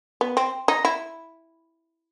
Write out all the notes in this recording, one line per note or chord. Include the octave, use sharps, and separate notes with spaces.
B3
C4
D#4
E4